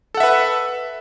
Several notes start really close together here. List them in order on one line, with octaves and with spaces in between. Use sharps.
A4 F#5 E5 B4